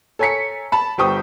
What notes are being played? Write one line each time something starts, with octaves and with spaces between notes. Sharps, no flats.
A4 C#5 G#5 A#5 B6 C#7
A5 B5
G1 G4 C5 G5 C#6 D#6